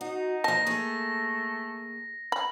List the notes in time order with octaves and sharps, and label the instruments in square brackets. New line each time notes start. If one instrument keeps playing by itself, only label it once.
[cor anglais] D#4 [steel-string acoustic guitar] F#4
[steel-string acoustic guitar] A#2 F3 [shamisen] A5 [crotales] A#6
[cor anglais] A3 [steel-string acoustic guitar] A#3 G#4 A4
[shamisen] B5